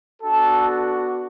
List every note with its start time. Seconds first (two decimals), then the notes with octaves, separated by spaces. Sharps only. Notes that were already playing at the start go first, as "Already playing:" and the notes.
0.23 B3 D4 F#4 A4